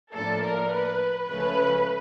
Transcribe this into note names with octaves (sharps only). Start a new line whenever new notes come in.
A2 F3 A#3 D4 A4
A#4
B4
C#2 C#3 F3 A3 C#4 B4